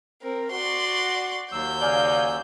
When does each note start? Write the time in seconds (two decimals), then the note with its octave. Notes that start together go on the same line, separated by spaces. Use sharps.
0.22 C4 A#4
0.51 F#4 D5 C6
1.52 D#2 F#3 E6 G6
1.82 C#3 D#4 D5 F5 G#5